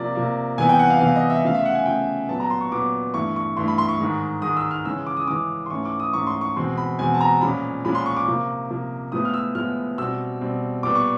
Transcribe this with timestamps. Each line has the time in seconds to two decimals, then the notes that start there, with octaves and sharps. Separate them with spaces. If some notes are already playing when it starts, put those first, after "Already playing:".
Already playing: C3 F3 A#3 D5
0.15 C3 F3 A#3
0.58 E2 C3 E3 G3 B3 G#5
0.69 G5
0.79 F#5
0.90 F5
1.01 E2 C3 E3 G3 B3 F5
1.16 D#5
1.30 E5
1.44 C#3 F3 A3 F5
1.55 E5
1.65 F#5
1.75 G#5
1.86 C#3 F3 A3 G5
2.29 A#2 F#3 B3 A5
2.40 A#5
2.50 C6
2.61 C#6
2.72 A#2 F#3 B3 D6
3.14 G2 E3 A3 C#6
3.36 C#6
3.57 G2 E3 A3 C6
3.68 B5
3.78 C6
3.89 C#6
4.00 G#2 D#3 G#3
4.42 G#2 D#3 G#3 D#6
4.57 E6
4.71 F6
4.85 C#3 E3 G#3 C#4 E6
5.07 D6
5.17 D#6
5.28 C#3 E3 G#3 C#4 D6
5.66 C6
5.71 G#2 E3 A3 C#4 C#6
5.85 D6
6.00 D#6
6.13 G#2 E3 A3 C#4 C#6
6.27 C6
6.41 C#6
6.56 E2 B2 G#3 C4 C6
6.78 B5
6.99 E2 B2 G#3 C4 G#5
7.14 A5
7.21 A#5
7.41 A#2 F3 G#3 C#4 B5
7.85 A#2 F3 G#3 C#4 B5
7.95 C6
8.06 C#6
8.17 D6
8.27 C3 F3 A#3
8.70 C3 F3 A#3
9.12 A2 F3 G#3 B3 D#6
9.25 F6
9.34 E6
9.55 A2 F3 G#3 B3 F6
9.98 B2 G3 C4 E6
10.41 B2 G3 C4
10.83 A#2 G3 B3 D6
10.95 C#6